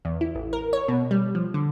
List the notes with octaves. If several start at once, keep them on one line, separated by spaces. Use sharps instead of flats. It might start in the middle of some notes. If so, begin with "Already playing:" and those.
E2
E4
A1
A#4
C#5
B2
G3
F3
D3